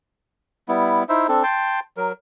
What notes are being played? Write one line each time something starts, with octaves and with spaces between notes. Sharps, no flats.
G3 B3 E4
D#4 E4 C5 E5
C4 D4 A4
G5 A5 C6
F#3 A#4